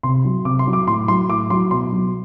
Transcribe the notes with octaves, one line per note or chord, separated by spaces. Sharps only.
C3 C6
F#3
C3 D6
C6
F#3
D6
A2 C6
F#3 C6
A2 D6
F#3 C6
B2 C6
F#3